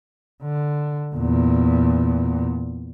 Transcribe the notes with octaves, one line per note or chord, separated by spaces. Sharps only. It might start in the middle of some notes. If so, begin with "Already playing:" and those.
D3
E2 A#2